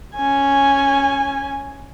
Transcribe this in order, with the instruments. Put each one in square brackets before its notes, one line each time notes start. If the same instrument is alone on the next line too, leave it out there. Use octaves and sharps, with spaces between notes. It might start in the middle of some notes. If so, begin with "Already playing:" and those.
[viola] C#4 G#5